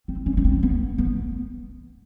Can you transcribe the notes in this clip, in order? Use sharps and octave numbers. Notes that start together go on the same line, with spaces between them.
C4
C#4
C#4
C4
B3
B3